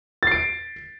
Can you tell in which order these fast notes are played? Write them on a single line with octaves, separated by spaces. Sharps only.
A6 C7 D7